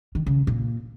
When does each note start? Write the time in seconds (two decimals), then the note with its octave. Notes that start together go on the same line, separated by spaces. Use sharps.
0.15 D#3
0.26 C#3
0.47 A#2